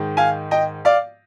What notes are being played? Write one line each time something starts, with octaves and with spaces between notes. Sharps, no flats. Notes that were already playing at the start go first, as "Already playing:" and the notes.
Already playing: G#2 D#3
F5 G#5
D#5 G5
D5 F5